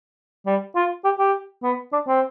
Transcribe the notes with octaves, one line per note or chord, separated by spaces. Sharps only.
G3
F4
G4
G4
B3
D4
C4